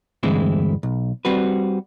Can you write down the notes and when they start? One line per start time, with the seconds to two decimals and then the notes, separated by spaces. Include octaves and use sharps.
0.23 D2 G2 E3 G#3 C4 E4
0.83 B1
1.25 G3 C4 F#4 B4